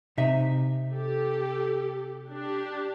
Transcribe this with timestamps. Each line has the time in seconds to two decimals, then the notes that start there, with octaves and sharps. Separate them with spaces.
0.18 C3 D#4 E5
0.92 G4 A4
2.30 D4 G4